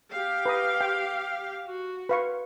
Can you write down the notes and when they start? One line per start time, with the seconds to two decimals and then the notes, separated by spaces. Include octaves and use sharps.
0.11 G4 F5
0.46 B4 A#5 D#6
0.81 G5
1.67 F#4
2.09 B4 F5 C#6